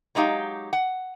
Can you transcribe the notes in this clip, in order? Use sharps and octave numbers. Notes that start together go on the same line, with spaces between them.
F#3 G#3 D#4 G4 F5
F#5